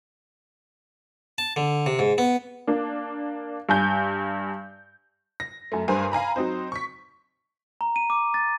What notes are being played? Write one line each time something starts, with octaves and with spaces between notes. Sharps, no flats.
A5
D3
C3
G#2
B3
A#3 D4
G2 G#5 G6
A#6
F#2 A3
G2 A#4 C5 G#5 C6
F5 G#5 A#5 B5
F#3 C4 D#4 C5
C#6 B6
A#5
D#7
D6
A6